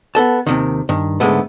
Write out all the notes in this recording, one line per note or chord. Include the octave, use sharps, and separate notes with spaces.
B3 A4 A5
D#2 C3 D#3
G2 D#3
C#2 G#2 D3 G#3 A3 B3